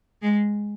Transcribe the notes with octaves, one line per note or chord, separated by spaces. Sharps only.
G#3